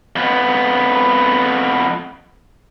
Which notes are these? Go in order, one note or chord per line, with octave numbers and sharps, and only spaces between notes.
F2 B3